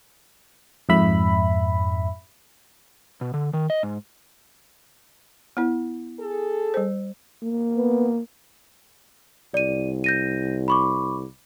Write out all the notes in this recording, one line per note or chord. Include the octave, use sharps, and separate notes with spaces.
F2 G#2 E5 B5
B2
D3
D#3
D#5
G#2
B3 E4
G#4 A4
G3 C5
A#3
B3
C2 D5 D#7
G6 A#6 D#7
B5 C#6 D6